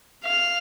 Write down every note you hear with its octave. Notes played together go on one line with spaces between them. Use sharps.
F5